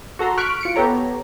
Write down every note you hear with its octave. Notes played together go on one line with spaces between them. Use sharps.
F#4 A4 A#5 C6
C#6 F6 F#6 B6 D7
F4 C#7 D7
B3 G4 A4 C#5 A#5